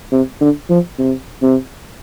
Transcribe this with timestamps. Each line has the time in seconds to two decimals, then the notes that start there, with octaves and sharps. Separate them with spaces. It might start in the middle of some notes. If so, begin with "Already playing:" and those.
0.12 C3
0.41 D3
0.70 F3
0.99 C3
1.42 C3